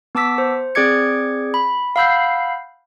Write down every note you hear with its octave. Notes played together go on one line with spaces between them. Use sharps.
B3 A5 D6 E6 B6
C5
C4 G#4 D5 D6 G#6 C#7
B5
F5 F#5 B5 E6 G6 C7